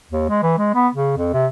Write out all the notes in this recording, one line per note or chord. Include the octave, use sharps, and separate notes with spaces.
D#2
G#3
E3
G#3
B3
C#3
F2
C3